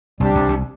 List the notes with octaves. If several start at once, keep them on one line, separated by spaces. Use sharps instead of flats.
C2 C3 G3 D4 G4
C2 C3
C2 C3